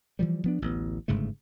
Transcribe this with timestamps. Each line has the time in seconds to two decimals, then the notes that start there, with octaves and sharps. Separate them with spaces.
0.19 E3 F3 G3
0.44 F3 B3 D4
0.62 A1 D2 B3
1.08 G1 G#2 C#3 A3